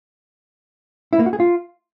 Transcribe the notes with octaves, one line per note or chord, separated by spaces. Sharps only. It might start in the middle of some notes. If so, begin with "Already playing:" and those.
E4
A#3
F#4
G#4
F4